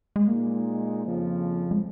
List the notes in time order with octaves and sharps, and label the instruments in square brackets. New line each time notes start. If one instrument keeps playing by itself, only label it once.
[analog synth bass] G#3
[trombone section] A#2 G#3 D#4 [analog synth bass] A#3
[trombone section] F2 C#3 F3
[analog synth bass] G#3